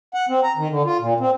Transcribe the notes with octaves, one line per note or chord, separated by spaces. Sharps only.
F#5
C4
A#5
D#3
D3
F4
A#2
C4